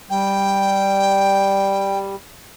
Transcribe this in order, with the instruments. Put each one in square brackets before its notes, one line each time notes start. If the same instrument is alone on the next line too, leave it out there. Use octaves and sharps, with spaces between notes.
[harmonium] G3 [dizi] G5